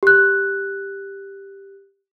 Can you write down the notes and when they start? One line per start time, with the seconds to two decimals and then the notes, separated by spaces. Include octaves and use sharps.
0.03 G4 F#6